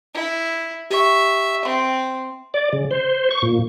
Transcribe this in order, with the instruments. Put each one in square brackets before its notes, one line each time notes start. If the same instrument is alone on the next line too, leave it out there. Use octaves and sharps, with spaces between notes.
[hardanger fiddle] E4
[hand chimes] G4 C#6 [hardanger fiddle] E5
[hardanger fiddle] C4 [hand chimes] C6
[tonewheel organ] D5
C#3
C5
C#6
A#2